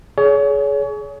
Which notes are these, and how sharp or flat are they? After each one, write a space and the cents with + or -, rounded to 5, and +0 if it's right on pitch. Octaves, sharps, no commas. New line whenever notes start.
G#4 +25 C#5 +35